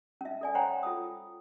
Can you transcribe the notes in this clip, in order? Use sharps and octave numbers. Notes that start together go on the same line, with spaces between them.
C#4 E5
A4 D5 G#5
C5 C#5 F#5 G5 A#5 C6
F4 A4 D#6